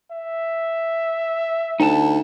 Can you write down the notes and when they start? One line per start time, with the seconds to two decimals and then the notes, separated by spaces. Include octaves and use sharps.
0.11 E5
1.80 D2 D#4 A5